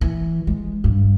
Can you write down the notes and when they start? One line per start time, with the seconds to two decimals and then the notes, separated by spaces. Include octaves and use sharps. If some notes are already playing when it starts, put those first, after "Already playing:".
0.01 E3
0.47 G#3
0.84 G2